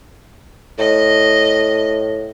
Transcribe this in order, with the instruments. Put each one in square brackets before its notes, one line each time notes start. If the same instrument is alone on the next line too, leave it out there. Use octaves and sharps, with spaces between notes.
[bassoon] A2 [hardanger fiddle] D#5